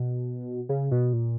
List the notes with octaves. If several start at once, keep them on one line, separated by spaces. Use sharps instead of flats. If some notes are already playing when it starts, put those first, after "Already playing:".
Already playing: B2
C#3
B2
A#2